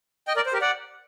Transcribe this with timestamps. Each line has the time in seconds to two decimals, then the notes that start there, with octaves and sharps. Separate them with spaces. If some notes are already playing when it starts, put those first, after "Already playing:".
0.28 D#5 G5
0.36 A#4 D5
0.46 C5
0.53 G4 A#4
0.61 D5 F#5